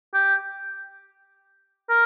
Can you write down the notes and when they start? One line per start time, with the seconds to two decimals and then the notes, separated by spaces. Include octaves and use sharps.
0.14 G4
1.89 A#4